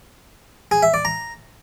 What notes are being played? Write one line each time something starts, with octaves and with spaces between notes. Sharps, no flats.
G#4
E5
D5
A#5